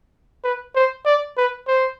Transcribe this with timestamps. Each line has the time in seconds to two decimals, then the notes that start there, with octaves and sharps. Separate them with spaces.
0.44 B4
0.75 C5
1.06 D5
1.37 B4
1.68 C5